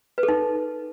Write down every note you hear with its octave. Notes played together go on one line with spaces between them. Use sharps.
B4
A4
D#4